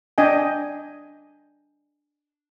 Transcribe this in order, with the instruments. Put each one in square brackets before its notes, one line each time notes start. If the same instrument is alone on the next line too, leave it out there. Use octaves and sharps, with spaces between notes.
[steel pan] D4 D#5 G5 G#5